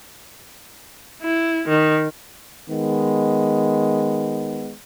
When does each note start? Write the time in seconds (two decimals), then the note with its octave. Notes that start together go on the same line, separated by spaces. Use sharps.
1.22 E4
1.68 D#3
2.69 D#3 G#3 B3